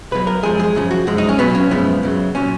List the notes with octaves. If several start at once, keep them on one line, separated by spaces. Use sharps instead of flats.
B1 B2 F#3 B4
A#4
F#2 F3 G#3 G#4
G#4
F#2 C#3 F3
F#4
F#2 F3 G#3
D#4
C#4
B1 B2 F#3 B3
C#4
F#2 C#3 F3 G#3 B3
F#2 C#3 F#3
A#2 F#3 C#4